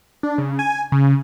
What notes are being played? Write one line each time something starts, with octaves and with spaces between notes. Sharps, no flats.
D4
C#3
G#5
C#3